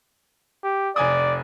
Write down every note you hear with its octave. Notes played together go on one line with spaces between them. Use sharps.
G4
F1 D5 G#5 D#6